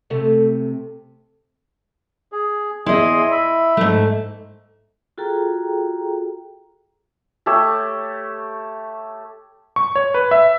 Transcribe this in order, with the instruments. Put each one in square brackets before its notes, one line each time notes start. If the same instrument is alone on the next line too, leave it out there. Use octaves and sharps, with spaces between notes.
[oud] C3 A3
[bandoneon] G#4
[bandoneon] E2 G#4 C6 [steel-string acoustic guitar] E4 D#5
[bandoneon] E5 B5
[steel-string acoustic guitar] G#2 A3
[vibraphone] F4 F#4 G#4 A4 G5 A#5
[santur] A3 G4 A4 C#5
[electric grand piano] C#6
C#5
B4
E5